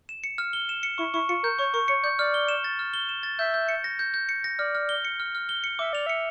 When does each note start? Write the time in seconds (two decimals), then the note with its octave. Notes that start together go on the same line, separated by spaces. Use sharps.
0.09 E7
0.24 C#7
0.38 F6
0.53 G7
0.69 E7
0.83 C#7
0.98 E4 C#6
1.14 E4 C#6
1.29 F4 C#7
1.43 A#4 G6
1.59 C#5 C#6
1.74 A#4 C#6
1.88 C#5 C#7
2.03 D5 G6
2.19 D5 F6
2.34 G7
2.49 E7
2.64 A6
2.79 F6
2.94 G7
3.09 E7
3.23 A6
3.39 E5 G6
3.54 G6
3.69 C#7
3.84 A#6
3.99 G6
4.14 G6
4.29 C#7
4.44 A#6
4.59 D5 F6
4.75 F6
4.89 G7
5.05 C#7
5.20 F6
5.35 F6
5.49 G7
5.64 C#7
5.79 E5 D6
5.93 D5 F7
6.06 E5 C#7